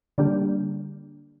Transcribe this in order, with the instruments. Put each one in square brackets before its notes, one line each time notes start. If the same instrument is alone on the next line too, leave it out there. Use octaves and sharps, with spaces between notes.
[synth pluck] D3 G3 A#3 D4 G4